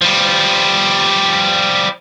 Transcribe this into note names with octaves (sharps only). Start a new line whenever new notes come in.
F3 G3